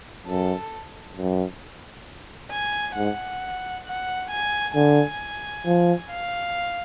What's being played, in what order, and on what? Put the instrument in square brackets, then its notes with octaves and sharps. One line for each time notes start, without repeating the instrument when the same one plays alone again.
[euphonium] F#2 [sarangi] A4
[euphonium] F#2
[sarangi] G#5
[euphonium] G#2 [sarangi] F#5
[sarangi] F#5
G#5
[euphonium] D3 [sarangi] G#5
[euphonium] F3
[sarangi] F5